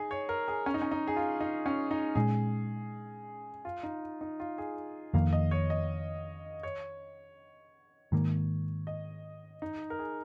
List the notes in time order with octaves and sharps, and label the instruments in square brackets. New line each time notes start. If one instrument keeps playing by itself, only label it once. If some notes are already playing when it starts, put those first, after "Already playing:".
Already playing: [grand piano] D#4 G#4
C#5
A#4
G#4
C#4
D#4
C#4
D#4
G#4
F4
D#4
C#4
D#4
[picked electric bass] A#2 G#3 C#4 [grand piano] G#4
[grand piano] F4
D#4
D#4
F4
G#4
[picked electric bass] F2 D#3 A#3 [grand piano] F5
[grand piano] D#5
C#5
D#5
C#5
[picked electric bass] G#2 D#3 A#3
[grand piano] D#5
D#4
A#4
G#4